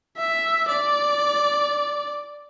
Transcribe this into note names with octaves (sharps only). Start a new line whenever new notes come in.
E5
D5